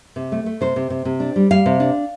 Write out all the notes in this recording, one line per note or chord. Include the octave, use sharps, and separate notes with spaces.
C3
A3
A3
C3 C5
C3
C3
C3
D4
G3
G3 F5
C3
D4